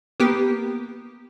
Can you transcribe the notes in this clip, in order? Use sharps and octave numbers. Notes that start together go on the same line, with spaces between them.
A#3 B3 G4